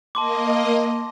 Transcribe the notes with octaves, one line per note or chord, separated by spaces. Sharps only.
A#3 D#5 A5 C6 D6